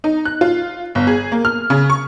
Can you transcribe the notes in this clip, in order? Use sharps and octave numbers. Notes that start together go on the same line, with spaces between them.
D#4
F#6
F4
G1
G#4
A#3
F6
C#3
C#6